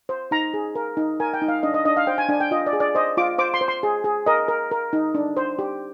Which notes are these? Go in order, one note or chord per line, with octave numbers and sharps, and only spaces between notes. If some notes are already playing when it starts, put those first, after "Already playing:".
C5
D#4 A#5
G#4
A#4
D#4
A#4 G#5
G5
D#4
F5
D4 D#5
D#5
D4 D#5
F5
C5 G5
G#5
D4 G#5
G5
F4 D#5
D5
G#4
D5
C5 D#5
F4 D6
C5 D6
C6
C5
C6
G#4
G#4
A#4 D#5
A#4
A#4
D#4
D4
C5
G4